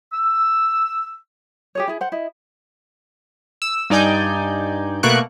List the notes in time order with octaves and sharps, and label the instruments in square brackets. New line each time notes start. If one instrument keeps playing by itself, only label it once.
[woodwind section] E6
[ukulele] G4 G#4 C#5
E4 G#4
C5 F#5
E4 D#5
[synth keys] E6
G2 D#4 D5 G#5 G6
B2 A3 A#3 C#6 F#6 D7